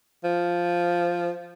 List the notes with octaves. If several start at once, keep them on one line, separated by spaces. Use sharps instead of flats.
F3